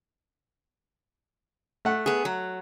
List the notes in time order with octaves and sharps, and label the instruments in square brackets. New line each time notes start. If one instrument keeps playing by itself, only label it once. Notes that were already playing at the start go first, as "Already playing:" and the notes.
[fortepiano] A3 F#5
[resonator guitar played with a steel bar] B3 G#4
F#3